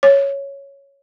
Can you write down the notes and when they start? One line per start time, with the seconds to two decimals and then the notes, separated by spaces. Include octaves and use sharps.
0.03 C#5